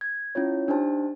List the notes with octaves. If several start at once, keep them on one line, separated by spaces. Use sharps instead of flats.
G#6
C#4 E4 F4 C#5
D4 D#4 G4 C5 A5